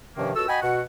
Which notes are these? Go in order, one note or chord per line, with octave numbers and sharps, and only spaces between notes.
G2 C3 D#3 F3 A#3 C#4
C#2 F#4 A4 E6
F#4 D#5 G5 G#5 B5
B2 F#4 F#5